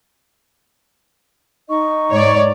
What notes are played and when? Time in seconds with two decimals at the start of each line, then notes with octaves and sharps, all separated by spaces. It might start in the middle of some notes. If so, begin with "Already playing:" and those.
1.68 D#4 D#5 C#6
2.11 G#2 C#5 D5